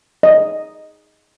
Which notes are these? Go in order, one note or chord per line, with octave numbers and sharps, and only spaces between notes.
D#5